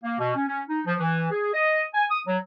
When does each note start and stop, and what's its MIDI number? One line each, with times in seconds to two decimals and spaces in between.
0.04 0.17 58
0.20 0.32 47
0.36 0.46 61
0.48 0.62 61
0.69 0.81 63
0.87 0.96 53
1.00 1.31 52
1.32 1.50 68
1.54 1.83 75
1.94 2.05 80
2.11 2.22 87
2.27 2.38 54